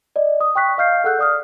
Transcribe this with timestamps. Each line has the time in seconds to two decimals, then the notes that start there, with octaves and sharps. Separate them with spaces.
0.16 D5 D#5
0.41 D#6
0.55 G5 C#6 F#6 B6
0.78 D#5 F5 F6 G6 C7
1.04 G#4 A4 F#5 E6 F#6 G6
1.19 D5 D#6 F6